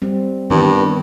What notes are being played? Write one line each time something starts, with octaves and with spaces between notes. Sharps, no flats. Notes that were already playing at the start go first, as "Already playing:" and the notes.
G3 C4
G2 D#3 E3 B3